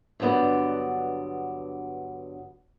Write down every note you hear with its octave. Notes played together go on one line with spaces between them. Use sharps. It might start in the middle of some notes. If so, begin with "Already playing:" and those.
G2 D3 F#3 B3 D5